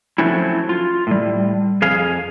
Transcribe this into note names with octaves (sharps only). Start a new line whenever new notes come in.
F3 F#3 A3 C4 C#4 E4
F4
A2 G3
F2 G#4 F5